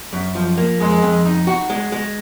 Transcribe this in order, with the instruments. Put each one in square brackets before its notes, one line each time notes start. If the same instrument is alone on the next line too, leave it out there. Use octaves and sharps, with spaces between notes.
[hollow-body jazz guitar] F#2
F3
A#3
[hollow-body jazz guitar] F2 [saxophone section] G#3
[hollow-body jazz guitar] F2
D#4
F#4
G#3
G#3